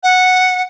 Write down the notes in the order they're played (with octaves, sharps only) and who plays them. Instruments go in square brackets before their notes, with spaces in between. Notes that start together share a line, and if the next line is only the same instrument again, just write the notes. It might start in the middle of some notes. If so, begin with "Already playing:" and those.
[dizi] F#5